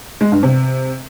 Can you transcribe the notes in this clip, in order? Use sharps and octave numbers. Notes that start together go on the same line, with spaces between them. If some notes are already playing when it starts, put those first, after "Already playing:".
G#3
G2
C3